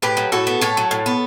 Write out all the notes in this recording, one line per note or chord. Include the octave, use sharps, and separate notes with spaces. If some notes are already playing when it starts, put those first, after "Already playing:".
A2 G4 B4
F#3
A2 F#4 A4
B3
A2 A4 C#5
F#3
A2
B3